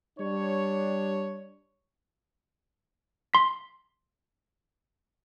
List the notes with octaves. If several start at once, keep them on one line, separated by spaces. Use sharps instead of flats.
G3 D4 C#5
C6 B6